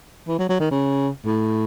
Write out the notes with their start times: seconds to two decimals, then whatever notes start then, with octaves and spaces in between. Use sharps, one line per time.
0.27 E3
0.38 F#3
0.49 F#3
0.60 D#3
0.71 C#3
1.25 A2